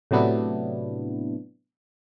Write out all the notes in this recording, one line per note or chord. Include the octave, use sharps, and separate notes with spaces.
A2 C3 F#3 B3 D4 E4